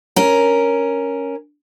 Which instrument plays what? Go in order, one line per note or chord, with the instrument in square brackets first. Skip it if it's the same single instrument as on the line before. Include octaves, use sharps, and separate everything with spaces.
[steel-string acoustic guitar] C#4 A#4